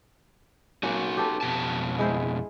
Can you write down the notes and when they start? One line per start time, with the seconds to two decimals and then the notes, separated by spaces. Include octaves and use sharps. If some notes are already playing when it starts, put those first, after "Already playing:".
0.83 F#3 A#3 C#4 D#4 F#4
1.17 G4 A4 B4
1.41 F2 B2 A5
1.99 G#3 E4 C5